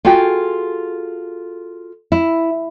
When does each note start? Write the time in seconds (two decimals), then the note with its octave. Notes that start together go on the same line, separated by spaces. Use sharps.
0.05 F4 F#4 G#4 A4 G5
2.12 E4